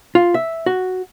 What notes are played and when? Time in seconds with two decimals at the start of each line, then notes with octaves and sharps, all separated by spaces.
0.15 F4
0.34 E5
0.66 F#4